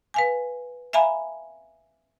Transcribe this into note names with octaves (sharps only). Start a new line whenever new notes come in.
B4 F5 G#5
E5 F5 G#5 A#5 B5